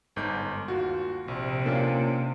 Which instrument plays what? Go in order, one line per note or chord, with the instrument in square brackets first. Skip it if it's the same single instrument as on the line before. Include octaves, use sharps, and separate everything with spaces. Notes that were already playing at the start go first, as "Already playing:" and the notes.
[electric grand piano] G1 G#2 G6
[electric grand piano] D#2 F#4 [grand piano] F4
[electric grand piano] A#1 [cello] C3
[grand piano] A#3 C#4 F4 [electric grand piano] D4